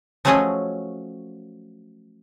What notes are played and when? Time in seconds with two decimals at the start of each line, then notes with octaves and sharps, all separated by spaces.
0.25 F3 F#3 A3 C#4 G#4 D#5